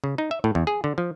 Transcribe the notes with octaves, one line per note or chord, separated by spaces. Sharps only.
C#3
D#4
E5
A2
E2
G#4
D3
F3